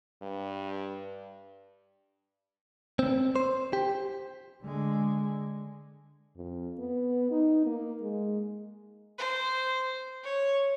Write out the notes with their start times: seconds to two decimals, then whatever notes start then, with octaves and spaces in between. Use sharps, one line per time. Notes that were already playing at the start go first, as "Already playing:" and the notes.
0.22 G2
2.99 C4
3.36 C5
3.73 G4
4.63 D3 G#3
6.36 F2
6.79 B3
7.31 D#4
7.66 A#3
8.02 G#3
9.18 C5
10.24 C#5